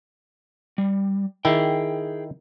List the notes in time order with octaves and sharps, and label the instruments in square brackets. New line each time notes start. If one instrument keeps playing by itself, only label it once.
[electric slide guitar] G3
[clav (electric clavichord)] D#3 E4 [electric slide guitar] G#4 G5